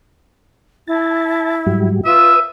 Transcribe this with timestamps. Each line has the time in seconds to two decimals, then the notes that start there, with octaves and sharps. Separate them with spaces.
0.87 E4 A5
1.67 G#2 F#3 G3
2.05 F4 B4 E5 D#6